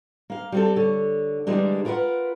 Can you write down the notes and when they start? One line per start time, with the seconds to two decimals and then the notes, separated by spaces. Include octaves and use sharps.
0.30 A#3 F5
0.52 G3 C4 A4
0.76 D3 C#5
1.47 D3 E3 G3 G#3 A#3 D4
1.85 F4 A#4 B4 D#5 F#5